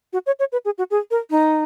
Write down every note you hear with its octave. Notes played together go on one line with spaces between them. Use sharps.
F#4
C#5
C#5
B4
G#4
F#4
G#4
A#4
D#4